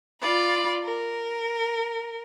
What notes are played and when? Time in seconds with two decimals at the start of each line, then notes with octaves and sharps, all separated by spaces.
0.22 F4 D5 B5
0.83 A#4